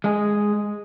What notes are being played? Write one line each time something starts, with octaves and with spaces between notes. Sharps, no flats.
G#3 G#4